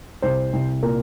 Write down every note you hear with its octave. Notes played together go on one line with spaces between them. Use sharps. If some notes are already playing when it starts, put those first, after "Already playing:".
C2 C5
C2
A#2 A#4